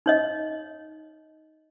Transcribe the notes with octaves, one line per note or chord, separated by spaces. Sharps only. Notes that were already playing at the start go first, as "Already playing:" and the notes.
D#4 C#5 D#5